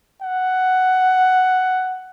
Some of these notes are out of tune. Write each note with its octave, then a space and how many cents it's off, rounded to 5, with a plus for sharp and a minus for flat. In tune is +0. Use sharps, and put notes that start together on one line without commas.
F#5 +5